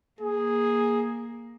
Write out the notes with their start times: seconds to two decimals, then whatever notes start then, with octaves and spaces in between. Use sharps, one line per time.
0.21 A#3 G#4